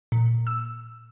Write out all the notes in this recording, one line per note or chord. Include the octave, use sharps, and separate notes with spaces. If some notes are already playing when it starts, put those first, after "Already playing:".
A#2
E6